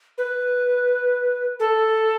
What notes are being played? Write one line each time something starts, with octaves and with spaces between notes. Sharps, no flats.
B4
A4